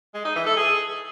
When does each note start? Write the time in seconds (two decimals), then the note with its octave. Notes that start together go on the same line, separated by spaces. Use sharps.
0.14 G#3
0.25 D#4
0.36 E3
0.46 A4
0.57 G#4